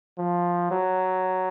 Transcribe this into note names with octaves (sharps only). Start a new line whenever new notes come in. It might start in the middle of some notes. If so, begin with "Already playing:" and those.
F3
F#3